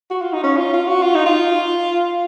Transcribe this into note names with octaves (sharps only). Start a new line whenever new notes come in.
F#4
F4
D#4
C#4
F4
F4
F#4
F4
D#4
F4